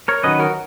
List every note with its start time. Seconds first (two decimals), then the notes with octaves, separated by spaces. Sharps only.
0.08 A#4 C#5
0.23 D#3 F#3 C#4 B4 D#5
0.39 F#4 A#4